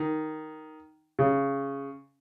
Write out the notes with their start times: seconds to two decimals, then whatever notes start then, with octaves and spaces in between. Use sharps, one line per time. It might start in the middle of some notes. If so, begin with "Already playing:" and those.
Already playing: D#3
1.19 C#3